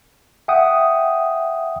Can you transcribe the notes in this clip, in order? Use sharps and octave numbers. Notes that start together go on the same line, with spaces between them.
E5 F#5 G5 D#6